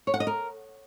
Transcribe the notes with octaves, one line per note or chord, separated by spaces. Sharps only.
C#5
F#5
D#5
A#4